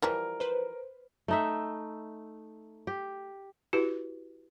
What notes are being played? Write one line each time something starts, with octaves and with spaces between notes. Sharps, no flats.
E3 F3 G3 A#4
B4 C5
A3 D#4 E5
G4
E4 F#4 G4 B4